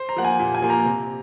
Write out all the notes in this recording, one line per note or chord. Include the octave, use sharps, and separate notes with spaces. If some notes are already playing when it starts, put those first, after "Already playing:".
Already playing: C5
A#5
F3 A#3 F#5
G#5
A#2
G#5
F3 A#3
A#5
C3